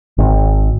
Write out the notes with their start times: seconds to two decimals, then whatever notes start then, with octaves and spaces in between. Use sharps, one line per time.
0.18 G#1